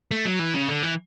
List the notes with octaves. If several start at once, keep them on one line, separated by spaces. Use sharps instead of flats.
A3
F#3
E3
C#3
D3
E3